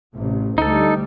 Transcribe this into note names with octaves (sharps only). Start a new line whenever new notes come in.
A1 C3
D2 G3 D#4 A4